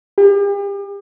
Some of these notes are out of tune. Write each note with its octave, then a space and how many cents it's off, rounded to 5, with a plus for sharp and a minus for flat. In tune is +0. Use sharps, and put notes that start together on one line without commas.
G4 +40